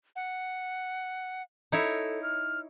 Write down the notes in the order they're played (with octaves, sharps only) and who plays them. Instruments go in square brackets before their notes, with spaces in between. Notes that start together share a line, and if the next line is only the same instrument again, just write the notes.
[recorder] F#5
[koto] D#4 E4 C#5 [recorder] A4
[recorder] F6